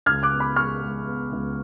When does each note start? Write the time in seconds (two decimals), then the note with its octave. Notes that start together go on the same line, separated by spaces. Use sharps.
0.06 C#2 F6 G#6
0.23 D6 F#6
0.32 B3
0.40 B5 D6
0.56 G#3 C#6 F6
0.82 G#3
1.07 B3
1.32 C#2